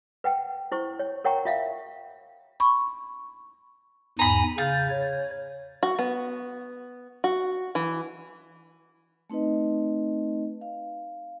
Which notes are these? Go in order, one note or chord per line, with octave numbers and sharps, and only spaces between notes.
B4 F#5 G5
E4 C5 C#6
C#5
A#4 C#5 F#5 G5 A#5 C#6
F4 E5 F5
B5 C#6
E2 G#2 G#5 A#5 B5
C#3 F5 G6 A6
C#5
F#4
B3
F#4
E3
A3 C4 D#4 B4 D#5
F5